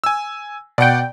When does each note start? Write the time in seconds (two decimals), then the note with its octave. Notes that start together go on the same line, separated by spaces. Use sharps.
0.04 G#5 E6
0.78 B2 D5 F#5 G5